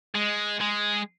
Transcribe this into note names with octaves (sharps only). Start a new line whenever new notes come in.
G#3
G#3